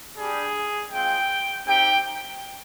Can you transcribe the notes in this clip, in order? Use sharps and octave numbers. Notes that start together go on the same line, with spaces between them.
G3 D4 G4 G#4
G#3 C4 F4 G5
C4 D#4 G4 G5